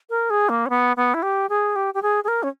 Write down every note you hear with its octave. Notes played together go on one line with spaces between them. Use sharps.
A#4
G#4
A#3
C#4
B3
B3
E4
G4
G#4
G4
G4
G#4
G#4
A#4
C#4